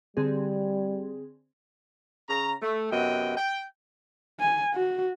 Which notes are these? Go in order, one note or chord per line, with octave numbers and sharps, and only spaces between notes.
D3 G3 C4 G#4
C#3 A#5
A3
F#2 C3 B3 D#5 G5
G5
G#5
F#4